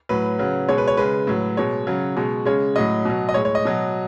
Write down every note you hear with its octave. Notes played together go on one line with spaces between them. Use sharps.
A2 F#3 B4
C#3 F#3
B2 G#3 C#5
B4
C#5
C#3 G#3 B4
A2 F#3
B2 G#3 C#5
C#3 F#3
B2 G#3
C#3 G#3 C#5
A2 F#3 D#5
B2 F#3
D#5
A2 G#3 C#5
C#5
D#5
B2 F#3